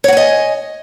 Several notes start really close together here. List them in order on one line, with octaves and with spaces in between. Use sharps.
C#5 F#5 G#5 D#5